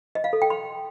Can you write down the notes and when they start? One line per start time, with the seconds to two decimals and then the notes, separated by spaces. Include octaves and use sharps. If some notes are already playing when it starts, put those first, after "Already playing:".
0.15 D#5
0.24 F5
0.33 A4
0.42 G5
0.50 C6